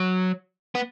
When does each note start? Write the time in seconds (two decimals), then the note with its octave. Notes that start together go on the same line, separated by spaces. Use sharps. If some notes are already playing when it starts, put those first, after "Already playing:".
Already playing: F#3
0.75 B3